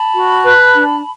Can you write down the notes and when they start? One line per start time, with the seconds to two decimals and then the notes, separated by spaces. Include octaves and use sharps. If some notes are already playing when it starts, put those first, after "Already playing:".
Already playing: A5 B5
0.13 F#4
0.44 B4
0.74 D4